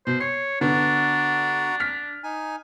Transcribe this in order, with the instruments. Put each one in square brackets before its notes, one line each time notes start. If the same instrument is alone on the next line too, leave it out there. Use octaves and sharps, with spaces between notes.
[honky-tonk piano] B2 [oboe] C5
[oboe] C#5 [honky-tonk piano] C7
[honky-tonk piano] D3 B3 [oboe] D4 [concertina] F#4 F#5 A#5
[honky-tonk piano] F6 B6
[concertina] D#4 G#5